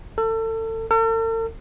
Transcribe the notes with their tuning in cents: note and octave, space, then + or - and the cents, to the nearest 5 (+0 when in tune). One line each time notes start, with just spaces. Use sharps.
A4 +30
A4 +45